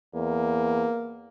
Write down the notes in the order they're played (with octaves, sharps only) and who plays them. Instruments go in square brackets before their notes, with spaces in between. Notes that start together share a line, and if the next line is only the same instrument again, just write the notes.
[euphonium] E2 [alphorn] A#3